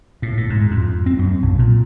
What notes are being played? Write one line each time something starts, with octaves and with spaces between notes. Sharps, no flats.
A2
A2
G#2
F2
C4
F#2
B1
A#2